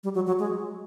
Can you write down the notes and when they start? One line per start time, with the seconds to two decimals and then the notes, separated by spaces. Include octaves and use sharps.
0.04 G3
0.15 F#3
0.27 F#3
0.39 G#3